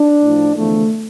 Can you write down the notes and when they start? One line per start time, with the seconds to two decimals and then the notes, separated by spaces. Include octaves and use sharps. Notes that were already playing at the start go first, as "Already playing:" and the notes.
Already playing: D4
0.23 A2 F3
0.56 E2 D3 F3 A3